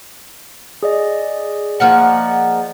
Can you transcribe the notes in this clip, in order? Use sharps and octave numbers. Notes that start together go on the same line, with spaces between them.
G#4 D5 D#5
F3 A#3 F#5